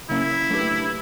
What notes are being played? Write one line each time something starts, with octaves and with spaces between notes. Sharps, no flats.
C#3 F#3 A#3 C#4 E4
F#3 A3 D4 G4 B4